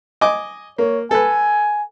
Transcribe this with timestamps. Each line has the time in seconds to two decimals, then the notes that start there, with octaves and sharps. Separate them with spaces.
0.21 D#5 G#5 D6
0.78 A#3 C#5
1.11 A4 B4 G#5